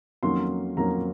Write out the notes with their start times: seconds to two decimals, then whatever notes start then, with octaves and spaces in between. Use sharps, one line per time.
0.23 F2 D#3 F#3 A#3 C#4 C6
0.77 F2 D#3 F#3 A#3 C#4 A#5